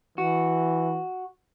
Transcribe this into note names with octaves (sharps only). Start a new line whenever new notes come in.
E3 F#4